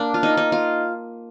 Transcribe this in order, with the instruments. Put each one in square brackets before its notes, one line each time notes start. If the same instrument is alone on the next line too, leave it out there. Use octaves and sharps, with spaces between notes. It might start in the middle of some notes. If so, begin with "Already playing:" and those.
Already playing: [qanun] A#3 D4
F4
D#4
D#4
F4